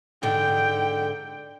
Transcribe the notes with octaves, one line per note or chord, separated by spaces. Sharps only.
G#2 D3 G5